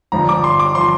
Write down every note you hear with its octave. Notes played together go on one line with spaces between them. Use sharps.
G1 G2 F3 A#5
D6
C6
D6
F3 C6